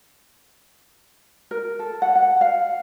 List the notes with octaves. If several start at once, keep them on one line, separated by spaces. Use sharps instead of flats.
A#4
A4
F#5
F#5
F5